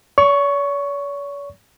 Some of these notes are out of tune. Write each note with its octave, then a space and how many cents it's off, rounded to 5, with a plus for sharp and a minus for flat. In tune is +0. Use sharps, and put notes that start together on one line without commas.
C#5 +45 C#6 +5